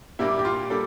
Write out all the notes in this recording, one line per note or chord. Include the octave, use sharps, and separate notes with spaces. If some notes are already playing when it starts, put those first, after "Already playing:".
A#2 G3 A#3 D4 E4
G4
F4
G3 A#3 D4 A4